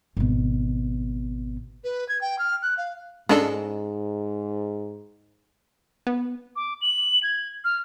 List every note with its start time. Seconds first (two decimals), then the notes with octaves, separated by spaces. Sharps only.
0.17 G#1 B2
1.83 B4
2.08 G#6
2.21 G5
2.38 F6
2.62 F#6
2.77 F5
3.29 G#2 G#3 C#4 D4 A4 D#5 A5
6.07 B3
6.56 D6
6.82 F#7
7.23 G#6
7.65 F6